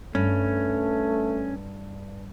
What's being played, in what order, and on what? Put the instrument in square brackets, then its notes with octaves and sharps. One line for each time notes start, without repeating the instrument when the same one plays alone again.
[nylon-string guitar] G2 [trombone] A3 [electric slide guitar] C#4